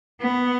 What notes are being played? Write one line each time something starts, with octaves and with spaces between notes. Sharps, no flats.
B3